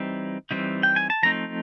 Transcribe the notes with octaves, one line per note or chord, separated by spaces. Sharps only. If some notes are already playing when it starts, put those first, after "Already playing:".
Already playing: E3 G3 C4 D#4
E3 G3 C4 D#4
G5
G#5
A5
F3 A3 C4 D#4 A#5